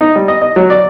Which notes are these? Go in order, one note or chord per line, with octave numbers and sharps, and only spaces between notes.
D#4
G3
D#5
D#5
F#3
D5